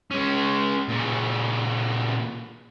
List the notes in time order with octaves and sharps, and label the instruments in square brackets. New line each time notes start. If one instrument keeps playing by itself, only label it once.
[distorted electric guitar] G#3 C#4
A#2 C#3